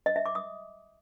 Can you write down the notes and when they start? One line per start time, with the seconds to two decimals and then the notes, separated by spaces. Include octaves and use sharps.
0.06 D#5
0.16 E5
0.26 D6
0.35 D#6